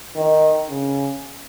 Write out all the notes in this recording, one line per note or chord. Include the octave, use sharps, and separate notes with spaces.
D#3
C#3